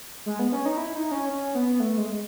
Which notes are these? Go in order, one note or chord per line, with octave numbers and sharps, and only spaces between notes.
G#3
B3
C#4
D#4
E4
D#4
C#4
C#4
B3
A3
G#3